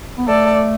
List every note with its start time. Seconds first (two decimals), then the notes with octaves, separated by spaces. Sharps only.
0.18 B3
0.27 A3 A4 D5